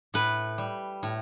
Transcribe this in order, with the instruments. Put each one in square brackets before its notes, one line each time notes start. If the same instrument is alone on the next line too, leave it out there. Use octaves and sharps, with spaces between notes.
[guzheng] A2 B4
G3
A2